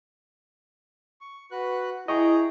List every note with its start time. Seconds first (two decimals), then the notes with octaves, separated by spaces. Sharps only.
1.21 C#6
1.51 F#4 B4 F#6
2.08 E4 G#4 D#5 G5 A#5 C#6